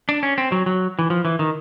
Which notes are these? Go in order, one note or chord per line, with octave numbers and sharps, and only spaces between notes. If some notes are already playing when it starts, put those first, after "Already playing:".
D4
C#4
C4
F#3
F#3
E3
F3
E3
D#3